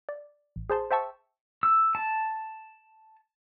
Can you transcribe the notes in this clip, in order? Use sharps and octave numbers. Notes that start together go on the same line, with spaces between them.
D5
A1
G#4 C5 A5 C6
C5 E5 G5 A5 C#6 E6
E6
A5